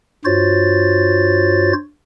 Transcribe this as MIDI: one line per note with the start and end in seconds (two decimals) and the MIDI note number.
0.25 1.73 43
0.25 1.73 65
0.25 1.73 66
0.25 1.73 72
0.25 1.73 73
0.25 1.73 93